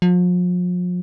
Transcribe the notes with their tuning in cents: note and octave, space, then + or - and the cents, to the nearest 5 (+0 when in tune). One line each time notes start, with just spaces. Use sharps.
F3 +40